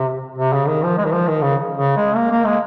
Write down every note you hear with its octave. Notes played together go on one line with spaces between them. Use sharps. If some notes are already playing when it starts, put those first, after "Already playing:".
Already playing: C3
C3
C#3
D#3
F3
G#3
D#3
F3
D#3
C#3
C#3
G#3
A#3
A#3
G#3